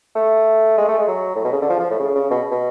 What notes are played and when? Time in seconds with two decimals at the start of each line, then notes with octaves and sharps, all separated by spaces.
0.16 A3
0.78 G#3
0.88 A3
0.98 G#3
1.08 F#3
1.35 A2
1.44 B2
1.52 C#3
1.61 D3
1.69 F3
1.80 F3
1.90 A2
2.00 C#3
2.15 C#3
2.30 B2
2.51 B2